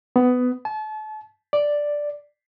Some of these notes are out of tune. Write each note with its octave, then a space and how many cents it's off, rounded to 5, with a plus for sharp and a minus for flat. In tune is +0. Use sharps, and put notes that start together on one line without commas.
B3 +15
A5 -35
D5 +0